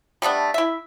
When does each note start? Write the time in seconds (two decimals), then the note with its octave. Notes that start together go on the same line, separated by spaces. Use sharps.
0.22 G3 A3 B3 D4
0.54 E4 E5